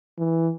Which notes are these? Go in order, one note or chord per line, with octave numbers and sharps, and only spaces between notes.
E3